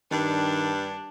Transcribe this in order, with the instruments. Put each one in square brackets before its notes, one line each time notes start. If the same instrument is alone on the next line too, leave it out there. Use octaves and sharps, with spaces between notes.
[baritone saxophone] G2 [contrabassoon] D#3 [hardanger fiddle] D4